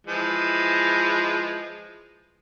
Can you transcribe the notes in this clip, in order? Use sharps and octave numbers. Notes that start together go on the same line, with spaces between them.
E3 F3 G#3